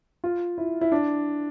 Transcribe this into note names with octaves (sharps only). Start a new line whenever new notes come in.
F4
E4
E4
D4